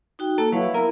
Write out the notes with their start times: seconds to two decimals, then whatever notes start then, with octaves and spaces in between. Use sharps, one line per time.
0.19 D#4 F#4 G5
0.38 A#3 A4 A5
0.52 F#3 E4 B4 F5 F#5
0.74 B3 A#4